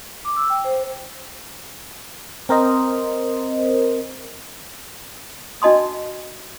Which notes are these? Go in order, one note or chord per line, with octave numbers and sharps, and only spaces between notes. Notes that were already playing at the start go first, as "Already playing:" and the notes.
D6
E6
G5
C5
C4 A#4 C5 D#5
D4 F#4 D#5 A5 C6 D#6